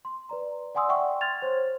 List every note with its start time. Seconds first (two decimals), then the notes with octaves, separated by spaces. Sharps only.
0.05 C6
0.29 B4 D5 A#5
0.75 D5 F#5 G#5 C6 D#6 E6
0.88 D5 E5 F#5 G5 C6 C#6
1.21 C6 F6 G#6 A6 F7
1.42 C5 C#5